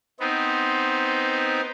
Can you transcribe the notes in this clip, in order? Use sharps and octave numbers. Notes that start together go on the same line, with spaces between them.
B3 C4 D#4